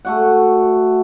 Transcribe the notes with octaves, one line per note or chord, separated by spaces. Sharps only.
A3 F#4 F#5